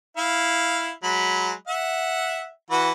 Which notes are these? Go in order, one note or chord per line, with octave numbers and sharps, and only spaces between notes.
E4 F5
F#3 G#3 B5
E5 F#5
E3 F#4 B4